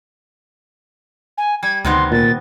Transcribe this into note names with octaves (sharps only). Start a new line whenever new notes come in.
G#5
G3 G#6
D2 C3 D#3 B3 C6
A#2 A6